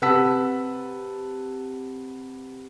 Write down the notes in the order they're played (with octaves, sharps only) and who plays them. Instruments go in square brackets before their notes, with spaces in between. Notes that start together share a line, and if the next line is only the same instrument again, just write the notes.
[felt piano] C3 B4 F#5 A5 E6 B6